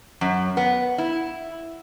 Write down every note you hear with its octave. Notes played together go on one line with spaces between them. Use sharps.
F#2
B3
E4